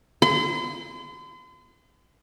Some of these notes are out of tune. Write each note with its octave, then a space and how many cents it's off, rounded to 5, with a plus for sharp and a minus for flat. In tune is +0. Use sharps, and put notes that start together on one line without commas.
C6 -40